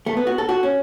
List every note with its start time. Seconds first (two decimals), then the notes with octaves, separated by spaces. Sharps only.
0.06 A3
0.17 B3
0.27 F#4
0.38 A4
0.49 F#4
0.63 C#4